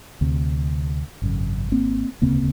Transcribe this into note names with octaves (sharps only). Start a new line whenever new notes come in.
D2 C3
G#1 F#2 C#3
A#3 C4
E1 D2 C#3 A#3 C4